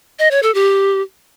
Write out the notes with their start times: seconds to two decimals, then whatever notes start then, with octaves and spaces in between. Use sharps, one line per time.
0.19 D#5
0.31 C#5
0.43 A4
0.55 G4